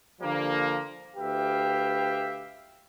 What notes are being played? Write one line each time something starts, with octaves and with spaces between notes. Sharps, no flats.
D3 F3 G3 A#3
D2 G4 B4 E5 F5 G5